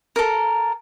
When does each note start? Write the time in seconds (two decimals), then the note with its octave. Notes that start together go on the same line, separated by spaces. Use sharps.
0.16 A4 A#4